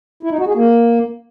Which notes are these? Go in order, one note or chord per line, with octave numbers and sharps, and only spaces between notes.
E4
D#4
F#4
G#4
A#3